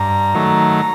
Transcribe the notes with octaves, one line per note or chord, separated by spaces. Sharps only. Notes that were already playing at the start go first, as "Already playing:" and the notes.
Already playing: G2 A#5
D#3 F#3 A3